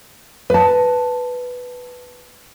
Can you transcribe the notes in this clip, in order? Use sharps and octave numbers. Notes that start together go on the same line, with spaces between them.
B4 A5